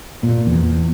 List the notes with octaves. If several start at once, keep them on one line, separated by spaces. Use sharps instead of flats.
A#2
E2